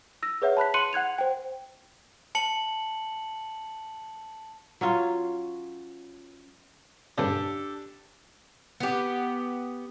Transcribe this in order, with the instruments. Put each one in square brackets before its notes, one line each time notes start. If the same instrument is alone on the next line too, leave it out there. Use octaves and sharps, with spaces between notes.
[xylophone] E6 A#6
G#4 B4 C#5 E5 F#5
A5 B5 F#6 B6
C6 F#6 C#7 D#7 F#7
F#5 F#6 G#6 F7
C5 G5
[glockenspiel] A5 C#7 F#7
[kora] F#3 C#4 F4
[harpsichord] G2 C#3 [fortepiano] D4 G4 A4
[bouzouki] B3 G4